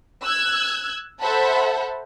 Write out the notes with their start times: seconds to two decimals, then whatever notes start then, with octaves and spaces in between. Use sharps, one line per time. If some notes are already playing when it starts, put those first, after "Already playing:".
0.24 E6 F#6 G#6
1.21 A4 C5 E5 F#5 A5 B5